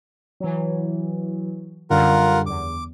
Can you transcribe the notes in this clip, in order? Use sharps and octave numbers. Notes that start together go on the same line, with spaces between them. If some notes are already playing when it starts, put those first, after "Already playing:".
E3 F#3
F#2 D3 G3 F4 A#4 F#5
E2 D6